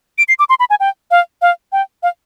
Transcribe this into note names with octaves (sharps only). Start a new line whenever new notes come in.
D7
C7
D6
C6
B5
G#5
G5
F5
F5
G5
F5